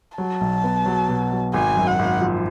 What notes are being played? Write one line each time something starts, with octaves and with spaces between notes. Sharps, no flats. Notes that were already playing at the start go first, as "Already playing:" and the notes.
F#3 A5
B1
B3
F#3
B2
F#3
G#1 G#5
F#2
F#5
G#1
F3